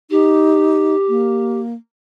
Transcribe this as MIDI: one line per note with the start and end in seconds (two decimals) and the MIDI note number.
0.11 0.95 63
0.11 1.60 67
1.09 1.74 58